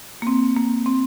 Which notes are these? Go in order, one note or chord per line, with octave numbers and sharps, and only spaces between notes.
A#3
C4
A#3
C4